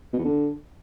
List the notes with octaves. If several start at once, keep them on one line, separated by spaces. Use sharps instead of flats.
B2
E2
D3